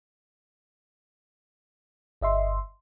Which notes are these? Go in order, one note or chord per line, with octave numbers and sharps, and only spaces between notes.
G1 D#5 E5 C6